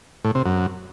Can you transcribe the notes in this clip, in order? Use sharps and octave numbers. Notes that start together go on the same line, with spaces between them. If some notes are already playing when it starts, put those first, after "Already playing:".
A2
C3
F#2